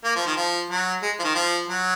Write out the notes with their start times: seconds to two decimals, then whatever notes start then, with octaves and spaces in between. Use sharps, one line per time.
0.04 A#3
0.15 F3
0.26 D#3
0.37 F3
0.70 F#3
1.02 G#3
1.19 F3
1.24 D#3
1.35 F3
1.68 F#3